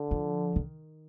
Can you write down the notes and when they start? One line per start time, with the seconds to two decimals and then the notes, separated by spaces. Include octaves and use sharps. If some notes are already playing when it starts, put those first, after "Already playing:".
Already playing: D3
0.11 F3
0.56 D#3